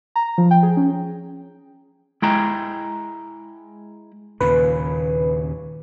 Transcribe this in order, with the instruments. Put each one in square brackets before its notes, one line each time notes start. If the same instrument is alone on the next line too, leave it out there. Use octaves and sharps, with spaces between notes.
[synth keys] A#5
F3
G5
G#4
C#4
[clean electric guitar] G#3 E4 G5 A#5
[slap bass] D#2 A#2 C#3 [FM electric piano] B4